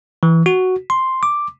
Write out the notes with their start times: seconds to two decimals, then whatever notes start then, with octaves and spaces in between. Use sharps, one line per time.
0.23 E3
0.46 F#4
0.90 C6
1.23 D6